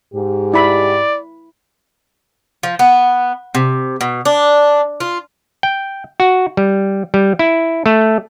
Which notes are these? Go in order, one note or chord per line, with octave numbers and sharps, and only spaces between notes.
G#2 G4
E4 D5 B5
F3
B3
C3
B2
D4
F4
G5
F#4
G3
G3
E4
A3